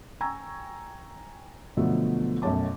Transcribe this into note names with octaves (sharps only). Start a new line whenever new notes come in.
G5 G#5 A#5 C#6 E6 G#6
B2 D3 F3 F#3 A3 B3
B1 F#2 A3 C#5 A5 D6